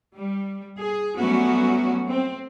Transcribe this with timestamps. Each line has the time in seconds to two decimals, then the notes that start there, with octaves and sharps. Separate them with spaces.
0.16 G3
0.79 G#4
1.17 F#3 G3 A3 B3 C#4 F#4
2.07 C4